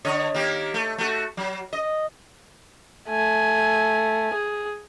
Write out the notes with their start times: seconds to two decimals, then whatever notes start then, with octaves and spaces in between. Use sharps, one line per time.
0.05 D3 C#5 D#5
0.34 D#3 A#3 G4
0.74 A3
0.98 A3 F#4
1.37 F#3
1.73 D#5
3.09 A3 G#5
4.34 G#4